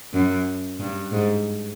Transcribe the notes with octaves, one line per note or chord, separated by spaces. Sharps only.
F#2
G2
G#2